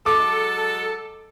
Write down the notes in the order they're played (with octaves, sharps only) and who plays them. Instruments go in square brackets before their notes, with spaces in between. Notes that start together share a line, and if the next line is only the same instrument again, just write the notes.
[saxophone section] F#3 G#3 A4 [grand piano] D6